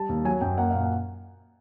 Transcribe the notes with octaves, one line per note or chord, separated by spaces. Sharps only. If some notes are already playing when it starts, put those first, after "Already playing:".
Already playing: G3 A5
D#2
F#3 G#5
F#2 G5
A#3 F#5
A#2 F5
F#5